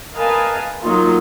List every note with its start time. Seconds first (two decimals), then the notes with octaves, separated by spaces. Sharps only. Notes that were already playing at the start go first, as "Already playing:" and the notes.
0.15 A#4 B4 D#5 F5 G#5 A5
0.82 F#3 A#3 D#4 F4